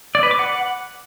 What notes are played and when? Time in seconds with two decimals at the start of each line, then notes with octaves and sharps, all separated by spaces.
0.15 D5
0.23 B4
0.31 D6
0.39 F#5